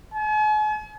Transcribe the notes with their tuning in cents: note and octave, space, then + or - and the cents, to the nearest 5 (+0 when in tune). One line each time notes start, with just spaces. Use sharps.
G#5 +45